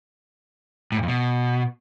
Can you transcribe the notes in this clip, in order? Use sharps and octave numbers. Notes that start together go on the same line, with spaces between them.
A2
G2
F2
B2